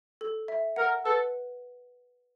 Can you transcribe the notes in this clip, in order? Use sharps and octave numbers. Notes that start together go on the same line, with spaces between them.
A4
E5
A#4 F#5
A4 B4